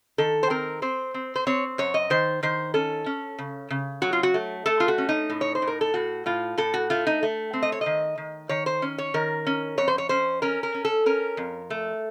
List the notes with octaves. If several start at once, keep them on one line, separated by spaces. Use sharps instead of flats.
D#3 A4
C5
C4 A#4
C4 C5
C4
C5
C4 C#5
F#2 C#5
D#5
D#3 C5
D#3 C5
C#4 A4
C#4
C#3
C#3
F#3 F#4
F4
F#4
A3
A3 A4
F4
F#4
C#4
D#4
A2
C#5
C5
A2
A#4
A4
A2 F#4
A2 F4
A2 A4
F#4
A3 F4
D#4
A3
C4
D#5
C#5
D#3 D#5
D#3
D#3 C#5
C5
C#4
C#5
D#3 A#4
C#4
F2 C#5
C5
C#5
C#4 C5
C#4 A#4
A#4
C#4
A4
C#4 A#4
F2
A3